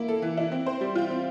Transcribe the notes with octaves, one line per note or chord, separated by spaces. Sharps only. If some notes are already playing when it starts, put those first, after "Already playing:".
Already playing: A#3 E4
A4
E3
E4
C4
C5
G3
F4
C4